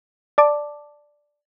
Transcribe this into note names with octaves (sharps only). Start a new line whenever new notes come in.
D5 A5 D6